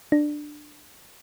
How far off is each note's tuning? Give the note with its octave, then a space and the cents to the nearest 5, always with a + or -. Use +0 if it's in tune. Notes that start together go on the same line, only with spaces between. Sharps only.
D4 +15